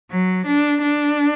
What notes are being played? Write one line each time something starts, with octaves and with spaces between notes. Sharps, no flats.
F#3
D4
D4